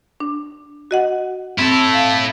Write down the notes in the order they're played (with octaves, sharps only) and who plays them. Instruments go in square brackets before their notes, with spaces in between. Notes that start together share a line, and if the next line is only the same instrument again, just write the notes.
[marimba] D4
F#4 D#5 F#5
[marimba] C4 [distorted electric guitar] E4 A4
[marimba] F5